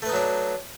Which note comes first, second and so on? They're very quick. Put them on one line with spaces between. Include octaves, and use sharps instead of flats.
A3 B4 D#4 F#3 D4